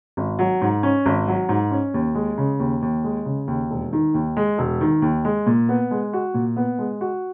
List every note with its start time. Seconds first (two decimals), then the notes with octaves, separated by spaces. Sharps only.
0.17 G#1
0.39 F#3
0.61 G#2
0.83 C#4
1.06 G#1
1.28 F#3
1.49 G#2
1.71 C#4
1.94 D#2
2.15 G#3
2.38 C#3
2.60 D#2
2.82 D#2
3.04 G#3
3.26 C#3
3.48 D#2
3.71 E1
3.93 D#3
4.14 D#2
4.37 G#3
4.58 E1
4.81 D#3
5.02 D#2
5.25 G#3
5.46 A#2
5.69 B3
5.91 G#3
6.13 F#4
6.34 A#2
6.57 B3
6.78 G#3
7.01 F#4